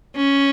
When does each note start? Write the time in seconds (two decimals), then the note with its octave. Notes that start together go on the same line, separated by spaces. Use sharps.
0.16 C#4